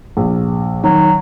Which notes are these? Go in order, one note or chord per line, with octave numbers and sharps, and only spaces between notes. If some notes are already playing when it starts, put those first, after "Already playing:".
A#1
D#3 F#3